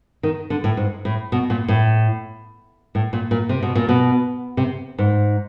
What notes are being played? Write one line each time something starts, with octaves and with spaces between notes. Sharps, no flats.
D#3
D3
A2
G#2
A2
B2
A#2
A2
A2
A#2
A#2
C3
B2
A#2
B2
C3
G#2